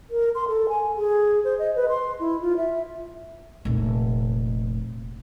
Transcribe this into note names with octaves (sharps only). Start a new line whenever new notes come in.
A#4
C6
A4
G#5
G#4
C5
D#5
B4
C6
E4
F4
E5
F1 A#2